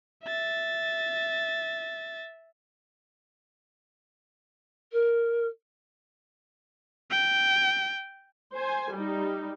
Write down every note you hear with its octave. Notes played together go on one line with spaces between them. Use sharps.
E5 A6
A#4
G5
C5 G#5
G3 D#4